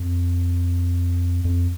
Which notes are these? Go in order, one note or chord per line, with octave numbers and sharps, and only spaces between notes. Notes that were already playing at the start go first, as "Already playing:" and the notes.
Already playing: F2
F2